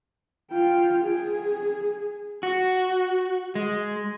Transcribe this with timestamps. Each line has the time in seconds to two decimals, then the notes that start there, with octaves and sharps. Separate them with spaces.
0.51 F4 G5
1.05 G#4
2.43 F#4
3.55 G#3